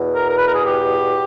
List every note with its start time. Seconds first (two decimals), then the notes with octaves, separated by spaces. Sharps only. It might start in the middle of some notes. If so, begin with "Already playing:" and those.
Already playing: E2 B2
0.15 A#4
0.28 A#4
0.37 B4
0.47 A#4
0.55 G#4
0.65 G4